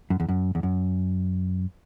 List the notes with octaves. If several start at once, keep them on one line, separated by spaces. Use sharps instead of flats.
F#2
E2
F#2
E2
F#2